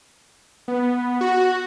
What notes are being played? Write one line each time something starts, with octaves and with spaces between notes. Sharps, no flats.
B3
F#4